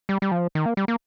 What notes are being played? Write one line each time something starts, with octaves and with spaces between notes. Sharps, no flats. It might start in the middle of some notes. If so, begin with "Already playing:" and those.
G3
G3
F3
D#3
A#3
G3
A#3